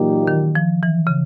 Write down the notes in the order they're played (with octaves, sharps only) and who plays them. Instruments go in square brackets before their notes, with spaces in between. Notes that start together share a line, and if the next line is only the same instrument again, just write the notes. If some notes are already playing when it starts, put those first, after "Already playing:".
Already playing: [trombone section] A#2 F#3 A#3 D#4 G4 [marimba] E3
[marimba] D#3
F3
E3
C#3